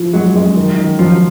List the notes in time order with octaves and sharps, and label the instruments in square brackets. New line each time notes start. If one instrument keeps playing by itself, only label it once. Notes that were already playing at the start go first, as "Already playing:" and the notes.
Already playing: [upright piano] F3 E4
[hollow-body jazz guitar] F#3 [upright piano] G#3
[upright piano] G#3
D#3
D#3
[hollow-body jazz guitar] F3 [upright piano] F#3